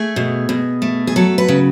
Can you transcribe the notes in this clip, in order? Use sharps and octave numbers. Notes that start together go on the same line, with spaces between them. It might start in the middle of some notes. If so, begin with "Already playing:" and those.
Already playing: A3 G#4
B2
B2
A3
G#4
F#3 A4
B4
C#3